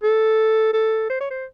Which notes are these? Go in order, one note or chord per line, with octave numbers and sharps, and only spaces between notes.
A4
A4
C5
C#5
C5